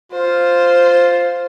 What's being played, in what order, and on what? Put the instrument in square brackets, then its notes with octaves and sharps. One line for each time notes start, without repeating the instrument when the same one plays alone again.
[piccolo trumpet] F4 [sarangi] C5